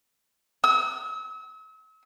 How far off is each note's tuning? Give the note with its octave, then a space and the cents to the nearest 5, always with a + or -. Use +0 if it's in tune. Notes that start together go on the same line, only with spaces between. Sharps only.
E6 -40